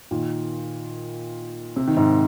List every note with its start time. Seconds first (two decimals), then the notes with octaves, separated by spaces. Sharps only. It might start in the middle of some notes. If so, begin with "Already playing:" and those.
0.11 A#2 D#3
1.76 C3
1.87 D#3
1.97 G#2 C3